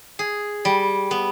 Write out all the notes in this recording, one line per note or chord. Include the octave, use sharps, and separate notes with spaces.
G#4
G3
B3